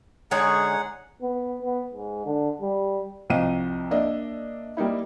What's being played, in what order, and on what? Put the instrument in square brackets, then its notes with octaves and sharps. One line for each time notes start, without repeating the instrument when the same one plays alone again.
[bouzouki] D3 G#3 C#5 [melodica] D#4 G#4 F#5
[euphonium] B3
B3
G#2
D3
G3
[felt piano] C2 F2 C4 D#5 F5 D#7
A#3 D4 D#5 E5
G3 A#3 D#4 E4